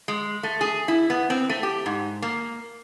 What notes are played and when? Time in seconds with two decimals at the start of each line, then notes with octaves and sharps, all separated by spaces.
0.08 G#3
0.43 A3
0.61 G#4
0.88 E4
1.10 B3
1.30 C4
1.49 A3
1.63 G4
1.86 G#2
2.22 A#3